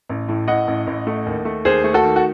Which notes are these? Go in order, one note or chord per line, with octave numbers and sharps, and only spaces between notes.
A1
A2
A2 D#5 F#5
A1
A1
A3
D#2
A3
D#2 G#4 C5
A3
F#4 A4
D#3
F#4